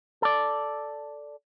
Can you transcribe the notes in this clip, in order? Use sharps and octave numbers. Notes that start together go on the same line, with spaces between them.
A4 D5